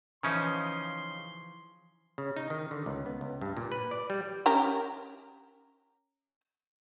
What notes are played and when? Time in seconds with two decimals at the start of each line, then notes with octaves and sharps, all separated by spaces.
0.23 C#3 E3 F3 C#4 D#4 C6
2.18 C#3
2.37 D#4
2.50 D#3
2.71 D3
2.86 C#2
3.06 B3
3.21 C#2
3.41 G2
3.57 A#2
3.72 B4
3.91 D5
4.10 G3
4.46 C#4 G4 A#4